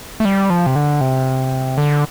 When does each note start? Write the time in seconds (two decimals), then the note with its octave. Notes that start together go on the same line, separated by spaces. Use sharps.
0.20 A3
0.25 G3
0.50 F3
0.66 C3
0.76 D3
1.01 C3
1.78 D3